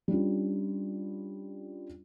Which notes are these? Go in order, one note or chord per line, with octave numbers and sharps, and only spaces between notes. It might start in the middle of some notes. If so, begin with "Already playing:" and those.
G3 C#4 D4 F4